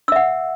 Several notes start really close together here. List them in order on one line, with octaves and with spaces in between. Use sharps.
E6 E5 F#5